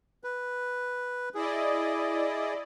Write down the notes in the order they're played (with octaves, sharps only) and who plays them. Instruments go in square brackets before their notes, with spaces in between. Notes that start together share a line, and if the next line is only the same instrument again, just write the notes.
[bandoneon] B4
[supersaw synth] E4 D5 D#5 [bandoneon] G#4